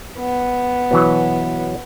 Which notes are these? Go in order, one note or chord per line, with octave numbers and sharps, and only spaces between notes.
B3
B2 E3 F#3